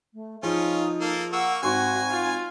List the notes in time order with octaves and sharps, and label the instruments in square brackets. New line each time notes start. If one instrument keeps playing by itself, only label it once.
[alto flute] A3
[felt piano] F3 G#4 [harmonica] C#4 F4 [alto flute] D#4
[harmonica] A#3 A4
[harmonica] A#3 C#6 E6 [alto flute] F#5
[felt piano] G#1 C6 C#6 [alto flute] C4 [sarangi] F#4 [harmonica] G#5
[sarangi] F4